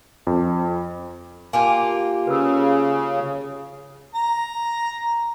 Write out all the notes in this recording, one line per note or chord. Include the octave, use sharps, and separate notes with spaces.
F2
A#3 F4 G4 G#5 A5
C#3 B4 C5 E6
A#5